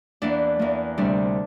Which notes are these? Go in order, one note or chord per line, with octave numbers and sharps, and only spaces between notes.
E2 E3 A#3 D4
E2 E3 A#3
D2 C3 G3 C4 D4